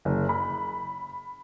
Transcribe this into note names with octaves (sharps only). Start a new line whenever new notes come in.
F#1
B5